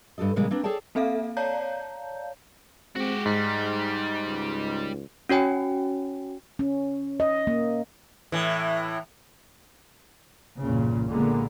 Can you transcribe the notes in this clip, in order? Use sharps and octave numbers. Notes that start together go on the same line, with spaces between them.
G2 G4 A4 D#5
A#2 C#3 F3 G3 G#3 A#3
A#3 C4 D4 B4
G#4 A4 C#5 D5 G5 A5
A#3 C4 A4 E5 F5
C#5 D5 F5 A5 A#5 G6
G#3 C4 F#4 G4
G#2 G3 D#4
C#2
C#4 F#4 C#5 G5 G#5
C#4
D#5
A#3
A2 E3
B1 E2 G2 A#2 C#3
A#2 D3 G#3 A#3 B3